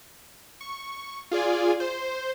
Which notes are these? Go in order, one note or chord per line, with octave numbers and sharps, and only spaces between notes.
C#6
F4 G#4 D5 G#5
C5